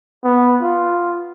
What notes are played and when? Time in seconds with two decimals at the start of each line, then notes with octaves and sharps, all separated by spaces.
0.24 B3
0.62 F4